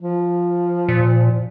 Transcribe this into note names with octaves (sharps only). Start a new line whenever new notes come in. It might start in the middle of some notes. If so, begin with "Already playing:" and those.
F3
A#2